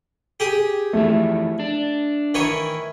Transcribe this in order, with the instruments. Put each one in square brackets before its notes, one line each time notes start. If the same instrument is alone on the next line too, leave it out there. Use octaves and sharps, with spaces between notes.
[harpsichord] G4 G#4
[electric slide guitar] F2 E3 [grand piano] A3
[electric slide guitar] D4
[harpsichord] D#3 E3 C#5